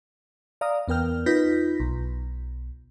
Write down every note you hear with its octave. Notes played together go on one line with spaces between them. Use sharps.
D5 F5 A#5 D#6
E2 B3 A#4 G5 F6
D#4 F4 B4 G6 A#6 B6
B1